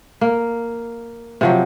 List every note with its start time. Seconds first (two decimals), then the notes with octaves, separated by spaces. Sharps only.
0.21 A#3
1.41 C3 F3 F#3